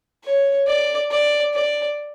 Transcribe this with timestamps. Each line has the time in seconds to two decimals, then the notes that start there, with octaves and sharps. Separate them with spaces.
0.25 C#5
0.67 D5
1.11 D5
1.54 D5